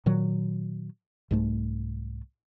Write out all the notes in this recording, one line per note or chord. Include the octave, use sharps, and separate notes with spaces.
A#2 D#3 F#3
C2 G#2 A3